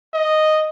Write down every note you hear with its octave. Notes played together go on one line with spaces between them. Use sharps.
D#5